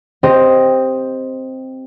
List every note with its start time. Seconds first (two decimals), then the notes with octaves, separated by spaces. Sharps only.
0.23 C4 G4 C5 D#5